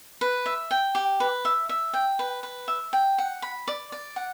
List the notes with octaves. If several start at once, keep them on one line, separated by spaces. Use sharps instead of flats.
B4
E5
G5
G4
B4
E5
E5
G5
B4
B4
E5
G5
F#5
B5
D5
D5
F#5